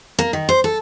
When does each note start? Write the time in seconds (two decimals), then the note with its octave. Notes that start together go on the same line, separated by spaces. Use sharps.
0.19 A#3
0.33 D#3
0.49 C5
0.64 A4